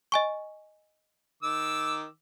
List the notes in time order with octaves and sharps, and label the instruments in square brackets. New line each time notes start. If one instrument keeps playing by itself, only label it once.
[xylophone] D#5 G#5 C#6
[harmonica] D#3 D6 E6